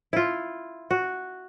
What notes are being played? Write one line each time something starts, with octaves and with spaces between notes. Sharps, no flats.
E4 F4
F#4